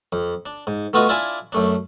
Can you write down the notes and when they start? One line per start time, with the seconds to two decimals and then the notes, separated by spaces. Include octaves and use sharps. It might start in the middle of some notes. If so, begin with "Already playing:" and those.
0.13 F2
0.46 D4
0.67 G#2
0.93 A3 B3 F4 F#4 D#5
1.08 D4 E4 F4 D5 E5 G#5
1.52 F#2 A3 D4